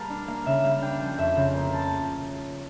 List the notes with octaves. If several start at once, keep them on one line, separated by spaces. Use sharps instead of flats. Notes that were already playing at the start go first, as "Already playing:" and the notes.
Already playing: G3 A#3 F5 A5
D4
A#3 F5
C#3 E5
G3 F5
D4 G5
F3 G5
F2 E5
C#3 F5
A#3
F3 A5